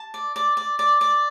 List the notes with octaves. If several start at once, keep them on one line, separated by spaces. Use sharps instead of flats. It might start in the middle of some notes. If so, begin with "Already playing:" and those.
Already playing: A5
D5
D5
D5
D5
D5